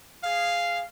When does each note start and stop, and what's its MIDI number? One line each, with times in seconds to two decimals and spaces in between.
0.24 0.83 68
0.24 0.83 77